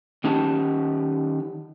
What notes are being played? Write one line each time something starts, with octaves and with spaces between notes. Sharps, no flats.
D#3 C#4 D#4 G4 A5